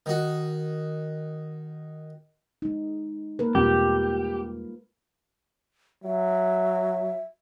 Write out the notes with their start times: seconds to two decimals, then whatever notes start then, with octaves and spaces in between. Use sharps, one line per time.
0.06 D#3 F#4
2.62 G#3 D#4
3.39 A#3 A#4 B4
3.55 E2 B2 G3 G#3 C4 F4 G4
6.04 F#3 E5